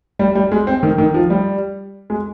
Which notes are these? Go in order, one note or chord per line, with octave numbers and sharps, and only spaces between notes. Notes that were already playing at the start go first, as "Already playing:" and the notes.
G3
G3
G#3
C4
D#3
D#3
F3
G3
G#3